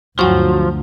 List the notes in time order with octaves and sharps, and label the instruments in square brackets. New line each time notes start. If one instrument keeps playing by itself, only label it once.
[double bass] D2 [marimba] G2 F#5 C#6 [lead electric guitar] F3 [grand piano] F#3